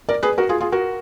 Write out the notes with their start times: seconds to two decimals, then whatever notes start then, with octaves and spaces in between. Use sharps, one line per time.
0.09 A#4 D5
0.23 G#4 B4
0.38 F#4 A#4
0.49 F4 G#4
0.61 F4 G#4
0.72 F#4 A#4